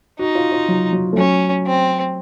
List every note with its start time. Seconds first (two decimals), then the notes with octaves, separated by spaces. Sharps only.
0.19 D#4 F#4
0.35 F4
0.52 F4
0.68 F#3
0.92 F#3
1.13 A3
1.17 F#3 C#4
1.66 C4